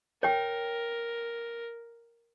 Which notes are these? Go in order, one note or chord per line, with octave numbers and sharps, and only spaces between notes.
A#4 C#5 G5